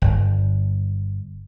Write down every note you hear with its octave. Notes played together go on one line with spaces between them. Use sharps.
G1